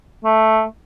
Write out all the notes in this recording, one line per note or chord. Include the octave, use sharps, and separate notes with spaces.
A3